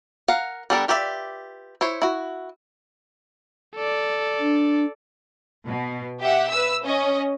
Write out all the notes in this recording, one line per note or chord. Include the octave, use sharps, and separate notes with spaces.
A#4 F5 F#5
G3 B3 D4 A4 A#4
F4 G4 B4 D5 E5
E4 C5 C#5
E4 F#4
A4 D5
D4
B2
G4 E5 F#5
B4 E6
C#4 D#5